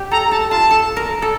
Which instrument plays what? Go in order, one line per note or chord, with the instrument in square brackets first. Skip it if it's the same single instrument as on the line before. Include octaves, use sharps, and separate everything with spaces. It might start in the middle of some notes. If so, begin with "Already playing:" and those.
Already playing: [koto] G4
[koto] A4 [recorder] A#5
[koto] A4 [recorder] A5
[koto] F4 [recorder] A5
[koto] A4
A#4
A4